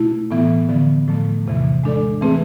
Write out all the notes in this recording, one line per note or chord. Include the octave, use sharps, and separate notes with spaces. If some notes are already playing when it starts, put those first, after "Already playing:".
Already playing: B2 A3 E4
A2 E3 B3
D3 F3 B3
A2 F3 A3
E2 C3 E3
G#3 D4 A4 D5
E3 A3 C4 G#4 B4